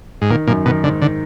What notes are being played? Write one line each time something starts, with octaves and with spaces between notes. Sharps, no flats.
G#2
A#2 D#3
F#2 A#2
B2 D#3
G#2 D3
D3